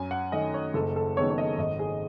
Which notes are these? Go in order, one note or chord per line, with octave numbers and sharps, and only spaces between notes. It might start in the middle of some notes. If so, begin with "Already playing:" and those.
Already playing: F#2 G#5
F#5
D#3 A3 D#5
C#5
F#1 A4
A4
F#2 D#3 G#3 B3 C#5
C#5
D#5
G#1 D#5
G#4